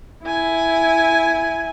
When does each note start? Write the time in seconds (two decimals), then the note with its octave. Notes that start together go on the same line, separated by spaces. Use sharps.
0.24 E4 G#5